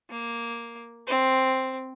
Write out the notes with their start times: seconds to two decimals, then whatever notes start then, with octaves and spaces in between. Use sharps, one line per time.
0.10 A#3
1.07 C4